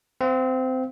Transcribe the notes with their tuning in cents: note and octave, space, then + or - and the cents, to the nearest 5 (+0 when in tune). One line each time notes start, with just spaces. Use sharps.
C4 -20 F5 +0